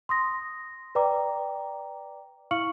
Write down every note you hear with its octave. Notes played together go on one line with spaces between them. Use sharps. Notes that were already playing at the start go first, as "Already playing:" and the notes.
C6 D#6 A#6
B4 D5 G5 A#5 D6
E4 F5 C#6 F6 C#7 F#7